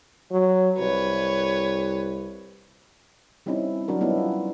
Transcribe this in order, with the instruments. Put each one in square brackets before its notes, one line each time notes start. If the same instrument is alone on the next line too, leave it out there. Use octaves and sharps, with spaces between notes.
[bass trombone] F#3
[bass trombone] C2 [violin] B4 C#5
[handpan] G3 C4 C#4 D#4 E4
F#3 D4 F#4 A#4
G3 B3 C#4 D#4 E4
F4